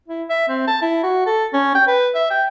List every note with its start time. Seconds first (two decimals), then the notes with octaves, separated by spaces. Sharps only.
0.08 E4
0.30 E5
0.49 C4
0.68 A5
0.82 E4
1.03 F#4
1.27 A4
1.54 C#4
1.75 G5
1.88 B4
2.15 E5
2.31 G5